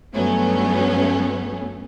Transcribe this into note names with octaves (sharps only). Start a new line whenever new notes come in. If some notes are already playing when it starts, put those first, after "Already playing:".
G2 F#3 A3 B3 C#4